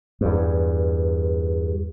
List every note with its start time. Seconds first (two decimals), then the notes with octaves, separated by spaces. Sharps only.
0.21 E2 G2